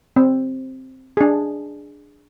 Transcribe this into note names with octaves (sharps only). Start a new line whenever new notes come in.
C4
D4 G#4